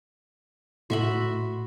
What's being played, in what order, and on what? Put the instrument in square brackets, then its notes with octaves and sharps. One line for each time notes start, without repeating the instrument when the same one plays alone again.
[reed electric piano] A2 C6 [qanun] F#4 E5 B5